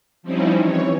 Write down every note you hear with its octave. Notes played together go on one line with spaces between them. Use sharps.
F3 G3 C4 C#4 D#4 E4
E3 C#5